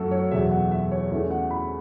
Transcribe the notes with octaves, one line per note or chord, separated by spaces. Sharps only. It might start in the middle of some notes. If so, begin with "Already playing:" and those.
Already playing: F#2 F#3 A3 C#4 F#4 A4
C#5
E2 B2 F#3 E5
F#5
E5
C#5
E2 E3 A3 C#4 E5
F#5
B5